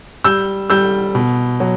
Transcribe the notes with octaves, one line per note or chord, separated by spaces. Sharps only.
G3 E6 G6
G3 E6 G6
B2
F#3